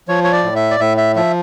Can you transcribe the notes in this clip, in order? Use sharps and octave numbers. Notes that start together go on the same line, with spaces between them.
F3 C#5
C#5
D5
A2
E5
D5
A2 E5
E5
F3 E5